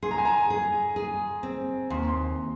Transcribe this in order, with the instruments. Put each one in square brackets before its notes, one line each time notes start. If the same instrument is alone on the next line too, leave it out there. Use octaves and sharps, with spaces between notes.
[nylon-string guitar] G#4 [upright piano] C6
[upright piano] A#5
G#5
A#5
[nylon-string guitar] G#4
G#4
C4
[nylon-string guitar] D#2 [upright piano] C6
[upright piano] C6